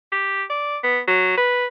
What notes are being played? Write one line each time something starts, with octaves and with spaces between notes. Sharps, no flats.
G4
D5
B3
F#3
B4